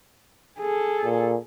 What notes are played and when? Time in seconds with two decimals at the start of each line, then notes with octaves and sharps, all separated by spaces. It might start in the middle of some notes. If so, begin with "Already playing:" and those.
0.60 G#4 A4
1.04 A#2